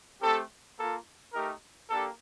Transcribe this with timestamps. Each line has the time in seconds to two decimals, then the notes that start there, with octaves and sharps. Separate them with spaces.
0.21 A3 C4 G4 A4
0.77 A#3 F4 A4
1.33 A3 D#4 G4 A#4
1.89 A#3 D4 G4 A4